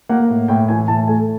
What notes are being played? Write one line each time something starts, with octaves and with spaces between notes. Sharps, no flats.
A#3 F#5
A2
A2 G5
E3 G#5
A2 A5
A3 G#5